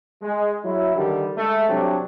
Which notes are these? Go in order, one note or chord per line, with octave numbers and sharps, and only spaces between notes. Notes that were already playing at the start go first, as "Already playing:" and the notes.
G#3
F#3 E4
D3 D#3 G3
G#3 A3
C3 F#3 G3 C4 D4